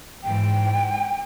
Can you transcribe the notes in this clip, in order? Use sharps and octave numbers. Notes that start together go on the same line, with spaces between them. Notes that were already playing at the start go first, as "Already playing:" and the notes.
G#2 E3 G5